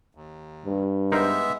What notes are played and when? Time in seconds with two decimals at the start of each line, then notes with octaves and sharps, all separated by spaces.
0.15 D#2
0.66 G2
1.12 G#3 B3 D#4 A#4 C5 E5